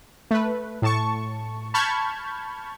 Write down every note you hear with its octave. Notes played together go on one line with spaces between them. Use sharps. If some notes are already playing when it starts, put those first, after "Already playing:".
A3 B4
A2 A5 C#6
A5 B5 C#6 F6 G6 G#6